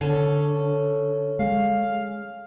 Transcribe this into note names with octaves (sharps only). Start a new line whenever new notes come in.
D3 C#4 A4
G#3 F5